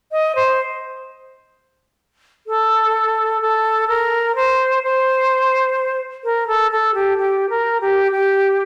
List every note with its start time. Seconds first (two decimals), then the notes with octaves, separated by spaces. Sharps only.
0.11 D#5
0.35 C5
2.47 A4
3.41 A4
3.88 A#4
4.35 C5
4.83 C5
6.24 A#4
6.47 A4
6.71 A4
6.94 G4
7.18 G4
7.49 A#4
7.80 G4
8.12 G4